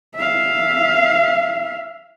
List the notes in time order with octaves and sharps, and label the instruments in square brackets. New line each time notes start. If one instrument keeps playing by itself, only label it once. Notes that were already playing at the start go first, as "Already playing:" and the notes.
[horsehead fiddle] E5 F5